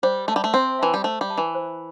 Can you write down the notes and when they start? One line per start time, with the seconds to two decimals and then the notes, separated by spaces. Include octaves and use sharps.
0.03 G3 C5
0.28 A3 E5
0.31 G3 A5
0.44 A3
0.54 C4 C5
0.79 E3 E5 A5
0.94 G3
1.04 A3 C5
1.21 G3
1.29 E5 A5
1.38 E3
1.55 C5